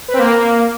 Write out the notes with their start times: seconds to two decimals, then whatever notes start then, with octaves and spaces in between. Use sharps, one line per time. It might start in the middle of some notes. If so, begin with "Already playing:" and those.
0.08 B4
0.13 C4
0.19 A#3